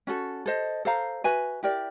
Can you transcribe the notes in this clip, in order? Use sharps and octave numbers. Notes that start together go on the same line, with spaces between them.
C#4 F#4 A4
A4 C5 D#5
A4 C5 F5 A#5
F#4 B4 E5 G#5
E4 G4 A#4 D5